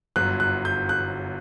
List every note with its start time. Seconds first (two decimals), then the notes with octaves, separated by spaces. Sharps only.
0.16 G1 F#2 F#3 F#6
0.40 F#6
0.65 G6
0.89 F#6